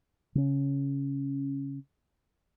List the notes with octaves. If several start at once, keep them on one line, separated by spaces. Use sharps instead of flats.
C#3 C#4